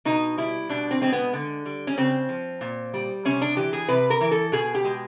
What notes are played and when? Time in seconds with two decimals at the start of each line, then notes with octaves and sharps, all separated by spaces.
0.05 B2 D#4
0.38 G3 E4
0.69 B2 D4
0.91 C4
1.01 G#3 C4
1.12 B3
1.33 D3
1.65 G3
1.87 C#4
1.97 C#3 C4
2.29 F3
2.61 A#2
2.94 G3
3.25 C3 C#4
3.41 D4
3.57 E3 G4
3.73 G#4
3.88 C3 B4
4.10 A#4
4.21 E3
4.31 A4
4.52 B2 G#4
4.75 G4
4.84 G#3